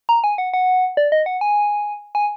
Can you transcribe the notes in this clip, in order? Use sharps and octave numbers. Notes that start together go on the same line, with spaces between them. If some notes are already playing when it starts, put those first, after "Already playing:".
A#5
G#5
F#5
F#5
D5
D#5
F#5
G#5
G#5